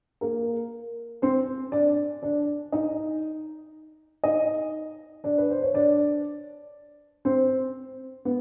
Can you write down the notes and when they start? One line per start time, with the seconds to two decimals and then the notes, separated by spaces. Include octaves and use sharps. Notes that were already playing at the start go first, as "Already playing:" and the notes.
0.21 A#3 A#4
1.22 C4 C5
1.72 D4 D5
2.23 D4 D5
2.72 D#4 D#5
4.24 D#4 D#5
5.24 D4 D5
5.38 B4
5.50 C5
5.63 C#5
5.74 D4 D5
7.25 C4 C5
8.25 B3